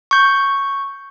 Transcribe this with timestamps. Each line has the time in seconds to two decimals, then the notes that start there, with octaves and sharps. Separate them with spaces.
0.11 C#6 G6